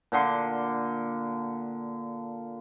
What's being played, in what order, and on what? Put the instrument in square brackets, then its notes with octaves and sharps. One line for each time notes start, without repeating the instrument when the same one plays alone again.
[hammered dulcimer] A#2 D3 C6